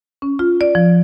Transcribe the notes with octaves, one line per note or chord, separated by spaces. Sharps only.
C#4
F4
D5
F3